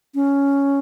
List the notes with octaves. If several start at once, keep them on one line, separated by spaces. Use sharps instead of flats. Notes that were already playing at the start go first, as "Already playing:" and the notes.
C#4